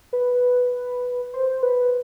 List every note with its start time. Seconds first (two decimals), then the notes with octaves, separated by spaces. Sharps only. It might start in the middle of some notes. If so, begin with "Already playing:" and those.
0.13 B4
1.34 C5
1.63 B4